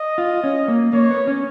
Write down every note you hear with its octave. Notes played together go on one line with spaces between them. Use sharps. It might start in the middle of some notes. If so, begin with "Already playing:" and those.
Already playing: D#5
F4
C#4
A#3
A#3 C#5
B3
C#4